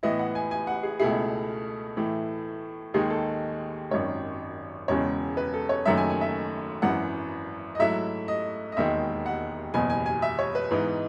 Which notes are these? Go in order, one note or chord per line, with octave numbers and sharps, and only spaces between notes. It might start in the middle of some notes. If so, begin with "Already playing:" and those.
A2 E3 B3 E4 D#5
F#5
G#5
G#5
F#5
G#4
C#2 B2 A3 E4 G#4
A2 E3 A3
D#2 D#3 G#3 D#4 G#4
A4
G#1 F#2 D#3 C#5
E1 E2 C#3 G#3 C#5
B4
A4
C#5
F#1 F#2 D#3 F#3 A3 E5
G#5
G#5
E5
G#1 F#2 E3 F#5
D#5
G#2 F#3 A3 E4 E5
D#5
D#5
E1 D#2 D#3 G#3 E5
F#5
F#1 E2 B2 G#5
G#5
G#5
E5
C#5
B4
G#2 E3 B3 D#4